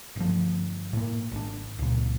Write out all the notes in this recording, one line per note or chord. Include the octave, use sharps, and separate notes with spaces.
G1 F3
A2 A#3
G#1 D4
C#2 A#2